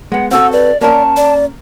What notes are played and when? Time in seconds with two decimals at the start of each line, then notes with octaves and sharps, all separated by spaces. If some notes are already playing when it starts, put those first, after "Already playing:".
0.12 G#3 B3 F#5
0.31 C4 F#4 A4 F#5 E6
0.52 B4 D5
0.81 A#3 C#4 A#4 D5 A5
1.17 D5